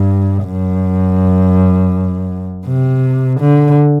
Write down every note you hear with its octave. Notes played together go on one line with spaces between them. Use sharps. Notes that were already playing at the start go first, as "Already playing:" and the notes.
Already playing: G2
F#2
C3
D3